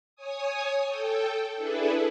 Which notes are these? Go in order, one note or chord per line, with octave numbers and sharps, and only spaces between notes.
C#5 G#5 D#6
A4 G5
D4 E4 G#4 A4 B4